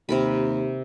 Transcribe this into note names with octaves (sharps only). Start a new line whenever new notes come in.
D#2 C3 A#4 B5